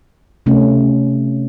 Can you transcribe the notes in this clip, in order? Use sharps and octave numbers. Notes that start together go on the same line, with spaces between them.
C3 A3 C#4